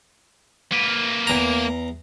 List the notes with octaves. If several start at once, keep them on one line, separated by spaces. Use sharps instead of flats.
A#3 B4
E2 A#5